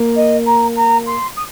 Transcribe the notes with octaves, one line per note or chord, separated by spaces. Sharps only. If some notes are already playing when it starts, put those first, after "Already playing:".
Already playing: A#3
D#5
A#5
A#5
C6
D#6